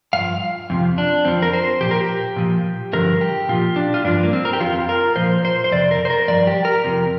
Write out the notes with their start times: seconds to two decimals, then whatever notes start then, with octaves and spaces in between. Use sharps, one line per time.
0.13 G2 F3 F5
0.70 F2 C3 F3
0.98 D4
1.25 F2 F3 C4
1.42 A#4
1.53 C5
1.81 A#2 F3 G4
1.91 A#4
2.01 G4
2.36 A#2 F3
2.93 G2 D3 F3 A#4
3.21 G4
3.49 A#2 F3 F4
3.76 D4
3.94 F4
4.04 G2 F3 D4
4.23 A#3
4.33 C4
4.45 A#4
4.53 G4
4.60 F2 F3 F4
4.89 A#4
5.16 A#2 F3 C5
5.45 C5
5.64 C5
5.72 F2 C3 D5
5.91 A#4
6.05 C5
6.10 A#4
6.28 G2 F3 D5
6.47 G4
6.65 A#4
6.84 F2 C3 F3